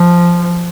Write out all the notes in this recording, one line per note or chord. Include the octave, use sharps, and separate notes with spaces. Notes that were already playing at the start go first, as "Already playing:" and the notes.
Already playing: F3